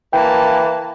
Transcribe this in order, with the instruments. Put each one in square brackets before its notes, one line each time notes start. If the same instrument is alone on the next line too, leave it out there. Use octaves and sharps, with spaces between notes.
[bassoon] E3 [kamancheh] A#3 A5 [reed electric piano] G5